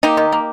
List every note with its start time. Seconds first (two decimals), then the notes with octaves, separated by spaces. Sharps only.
0.03 A#3 D#4 G4
0.17 D#3
0.32 A#3